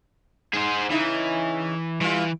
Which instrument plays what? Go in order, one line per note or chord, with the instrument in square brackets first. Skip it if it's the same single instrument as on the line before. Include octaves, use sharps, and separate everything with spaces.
[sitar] G#2 [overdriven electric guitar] G#4 C5
[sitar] C#3 D#4 E5 [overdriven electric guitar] E3
[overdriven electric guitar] E3 [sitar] G3 F4